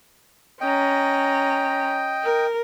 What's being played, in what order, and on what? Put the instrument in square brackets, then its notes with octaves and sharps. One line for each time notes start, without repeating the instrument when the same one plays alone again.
[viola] C#4 A#5 [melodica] D#5 G5
[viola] A#4